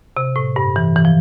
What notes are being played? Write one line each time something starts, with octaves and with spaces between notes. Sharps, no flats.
C3
A2
G2
E3
E3
F3